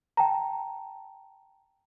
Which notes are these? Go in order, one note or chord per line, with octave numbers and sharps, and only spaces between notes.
G5 A5 A#5